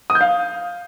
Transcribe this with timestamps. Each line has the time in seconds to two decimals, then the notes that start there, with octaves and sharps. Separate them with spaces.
0.10 D#6
0.15 G6
0.21 F5